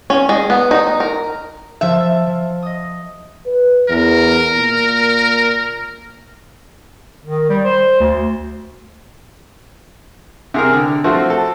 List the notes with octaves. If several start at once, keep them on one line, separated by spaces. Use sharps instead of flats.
C#4
G#3
B3
D#4
A#4
F3 E5 A5
F3
D#5 D#6
B4
E2 A#4
A#2
D#3
G3
C5
D2
C3 G#4 A#4
D3
F3 A3 C4 F#4
A4